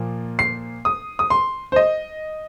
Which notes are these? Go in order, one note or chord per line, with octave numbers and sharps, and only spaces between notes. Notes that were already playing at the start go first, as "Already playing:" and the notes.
Already playing: A#2 F3 A#3
C7
D#6
D#6
C6
C5
D#5